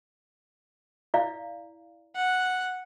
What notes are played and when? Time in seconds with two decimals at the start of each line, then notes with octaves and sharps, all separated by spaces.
1.14 E4 D5 F5
2.16 F#5